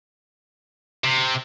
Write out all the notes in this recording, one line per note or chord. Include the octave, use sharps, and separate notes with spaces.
C3